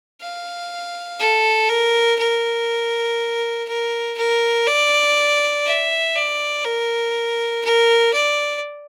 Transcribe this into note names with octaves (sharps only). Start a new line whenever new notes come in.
F5
A4
A#4
A#4
A#4
A#4
D5
E5
D5
A#4
A#4
D5